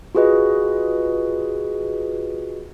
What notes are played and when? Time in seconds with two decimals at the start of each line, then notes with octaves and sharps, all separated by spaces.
0.15 F4 F#4 G#4 B4 D#5